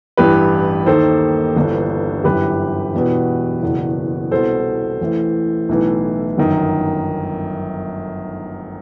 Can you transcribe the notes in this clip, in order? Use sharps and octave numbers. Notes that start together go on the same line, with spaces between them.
A1 G2 E3 G4 B4
D#2 D#3 A4 C5
G1 G2 E3
G1 F#2 E3 G4 B4
E1 E2 B2
F#1 E2 B2
C2 B2 A4 C5
A1 A2 E3
B1 A2 E3
G1 F#2 D#3